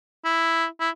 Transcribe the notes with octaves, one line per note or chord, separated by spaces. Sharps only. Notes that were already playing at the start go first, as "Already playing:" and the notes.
E4
E4